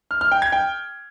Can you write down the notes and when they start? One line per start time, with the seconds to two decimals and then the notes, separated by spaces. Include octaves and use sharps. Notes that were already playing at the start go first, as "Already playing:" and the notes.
0.11 F6
0.21 F6
0.32 G5
0.42 G#6
0.52 G5